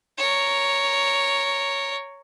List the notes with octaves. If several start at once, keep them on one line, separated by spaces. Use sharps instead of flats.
A#4 C#5